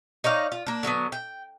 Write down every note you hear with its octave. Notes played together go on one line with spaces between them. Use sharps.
D#4 C#5 D5 F5
F4
A#3 D4
D3 F#3 A#3 B3
G5